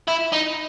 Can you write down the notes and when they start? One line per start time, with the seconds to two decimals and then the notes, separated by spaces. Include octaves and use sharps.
0.08 E4
0.32 D#4